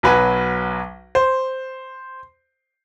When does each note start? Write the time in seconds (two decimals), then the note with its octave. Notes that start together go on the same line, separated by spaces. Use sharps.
0.03 B1 F#3 B4 G#5
1.15 C5